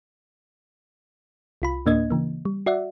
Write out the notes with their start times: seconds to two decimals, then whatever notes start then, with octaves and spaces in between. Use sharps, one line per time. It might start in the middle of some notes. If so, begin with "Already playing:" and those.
1.62 C2 F4 B5
1.86 D2 A2 A#3 D4 D#5 G#6
2.10 C#3 E3 A#3
2.45 G3
2.66 F#4 D5 E5 F#5